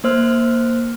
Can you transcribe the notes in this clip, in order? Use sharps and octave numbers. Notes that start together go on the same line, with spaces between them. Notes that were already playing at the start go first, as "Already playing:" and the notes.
A#3 C5 F6